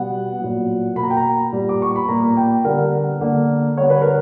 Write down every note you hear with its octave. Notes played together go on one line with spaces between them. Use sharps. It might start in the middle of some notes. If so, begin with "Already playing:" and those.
Already playing: B2 G3 B3 F#5
A#2 F#3 B3
B2 A#3 B5
A#5
G5
A#5
A#2 G3 B3
D6
C#6
B5
A#2 A#3 A#5
G5
D3 G3 B3 A#4
D3 A#3
D3 G3 B3 C#5
B4
A#4